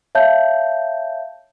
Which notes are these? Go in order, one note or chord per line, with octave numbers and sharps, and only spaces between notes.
C#5 E5 F5 A5 G6